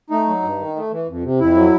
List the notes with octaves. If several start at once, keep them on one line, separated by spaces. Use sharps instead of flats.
A3 D#4
F#3
G2
D#3
A3
E3
F2
C3
F2 E4
F#3